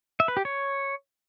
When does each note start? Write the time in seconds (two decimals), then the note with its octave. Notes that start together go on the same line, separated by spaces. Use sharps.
0.20 E5
0.28 B4
0.37 G4
0.45 C#5